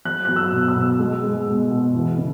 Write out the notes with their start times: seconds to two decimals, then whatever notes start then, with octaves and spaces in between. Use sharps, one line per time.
0.05 F#3 F#6
0.25 F#6
0.29 F#3
0.36 E6
0.53 B2
0.68 E6
0.75 B2
0.99 G#3
1.24 G#3
1.47 B2
1.71 B2
1.94 E3
2.18 C#3